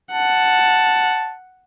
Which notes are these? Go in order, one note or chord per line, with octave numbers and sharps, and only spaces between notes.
F#5 A5